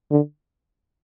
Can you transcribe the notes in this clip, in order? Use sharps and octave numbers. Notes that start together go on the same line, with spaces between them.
D3